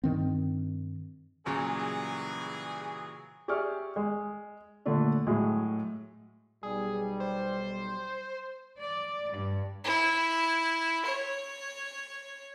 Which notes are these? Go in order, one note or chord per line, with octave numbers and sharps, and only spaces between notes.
G2 D#3 C4
A#2 C#3 E3 F#3 G3 G#4
G4 G#4 D5 E5 C#6 F6
G#3
A#2 D3 A3 D4
A2 F#3 G#3
B1 G3 G#4
C5
D5
G2
E4
C#5